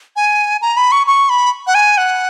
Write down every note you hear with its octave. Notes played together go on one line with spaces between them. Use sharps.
G#5
A#5
B5
C#6
C#6
B5
F#5
G#5
F#5